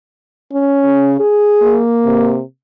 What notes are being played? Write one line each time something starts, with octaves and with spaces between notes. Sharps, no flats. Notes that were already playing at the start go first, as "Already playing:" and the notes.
C#4
C#3
G#4
A#3
C3